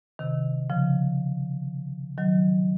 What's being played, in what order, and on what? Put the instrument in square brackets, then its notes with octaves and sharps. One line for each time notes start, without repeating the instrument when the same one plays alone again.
[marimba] C3 D#3
C#3 F3
D#3 F#3